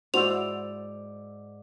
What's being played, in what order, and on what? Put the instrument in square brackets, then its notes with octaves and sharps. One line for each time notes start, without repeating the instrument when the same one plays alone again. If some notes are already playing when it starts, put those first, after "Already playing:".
[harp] G#2 D5 E6 [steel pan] E4 F#4 C5 [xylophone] F7